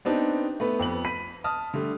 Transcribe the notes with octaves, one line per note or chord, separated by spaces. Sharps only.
B3 C4 D4 D#4 G4
A3 B3 B4
F2 B3 F#7
B5 B6 D#7
A5 D#6 F6
D3 G3 A3